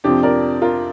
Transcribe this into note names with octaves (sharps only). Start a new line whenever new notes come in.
F2 C3 F3 D4 G4
A#4 D5
F4 A#4